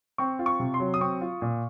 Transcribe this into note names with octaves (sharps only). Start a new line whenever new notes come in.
C4 C#6
F4
C#6
C3
C6
F#3
D#6
C4 C#6
F4
A#2